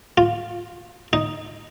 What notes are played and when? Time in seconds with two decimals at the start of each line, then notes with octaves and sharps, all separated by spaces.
0.18 F4
1.13 D#4